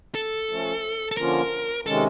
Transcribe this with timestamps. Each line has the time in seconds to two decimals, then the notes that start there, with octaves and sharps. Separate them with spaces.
0.15 A4
0.49 F3 A3 C#4
1.11 A4
1.17 D3 F3 A#3 C#4 F4 A#4
1.86 C3 D#3 G#3 C#4 A4